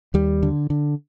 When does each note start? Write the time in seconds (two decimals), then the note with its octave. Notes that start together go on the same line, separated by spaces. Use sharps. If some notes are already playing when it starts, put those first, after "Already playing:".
0.14 D#2 G3
0.43 D3
0.70 D3